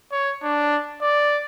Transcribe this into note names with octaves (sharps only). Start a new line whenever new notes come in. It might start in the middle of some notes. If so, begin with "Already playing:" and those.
C#5
D4
D5